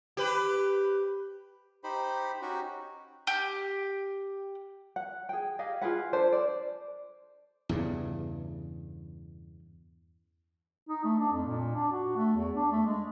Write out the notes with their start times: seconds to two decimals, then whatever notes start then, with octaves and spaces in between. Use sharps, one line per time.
0.17 G4 B4
1.84 D#4 G4 C5 B5
2.42 C#4 D#4 F#4 G4
3.27 G4
4.96 F#5
5.29 G#4 G5
5.59 G4 G#4 D#5 F5
5.81 F4 G#4 B4 F#5
6.13 D4 A4 C5
6.33 D5
7.69 E2 G2 C#3
10.89 D#4
11.04 A3
11.19 D4
11.33 F2
11.46 A#2
11.75 D4
11.92 F#4
12.16 A3
12.36 E2
12.55 D4
12.72 A3
12.86 G#3